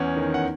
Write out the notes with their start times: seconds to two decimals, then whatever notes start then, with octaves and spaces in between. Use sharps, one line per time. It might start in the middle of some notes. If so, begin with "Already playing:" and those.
Already playing: E2 E3 C#4 F#5
0.17 D#3
0.34 F#5